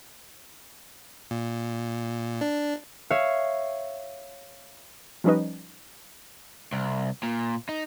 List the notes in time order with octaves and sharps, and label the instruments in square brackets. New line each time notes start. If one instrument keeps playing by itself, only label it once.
[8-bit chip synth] A#2
D4
[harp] C#5 E5 F5
[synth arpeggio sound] F3 G3 C#4 D#4 B4 D#5
[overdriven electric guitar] C2
A#2
D#4